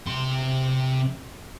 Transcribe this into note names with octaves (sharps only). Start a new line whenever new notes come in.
C3 C6